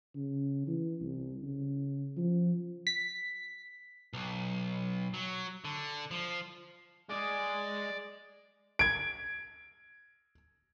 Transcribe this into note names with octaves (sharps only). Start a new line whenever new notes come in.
C#3
E3
C2
C#3
F3
B6
B1
F#3
D3
F3
G#3 G#4 D5
G#6 D7